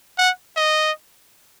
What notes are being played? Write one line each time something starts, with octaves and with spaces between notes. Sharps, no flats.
F#5
D#5